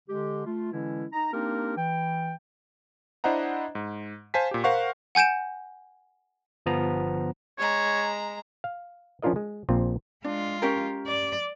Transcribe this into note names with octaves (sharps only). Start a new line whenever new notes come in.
D3 G#3 G4
A3 F4
D3 E3 G#3 C#4 E4
D#4 A#5
A#3 C4 D4 D#4 G4 A#4
E3 G5
D4 E4 C5 D#5 F#5 A#5
G#2
C5 F5 G#5 A5 B6
A#2 G4
A#4 C5 F5 F#5 C#6
F#5 G#5 G6 D7 E7
G1 F3 B3 A#5
G#3 C#5 A#5
F5
F3 C#4 D4 F4 A#4 D#5
G#3
A#1 A#2 C4 F4
G#3 D4 F4
C#4 G4 A#4
D5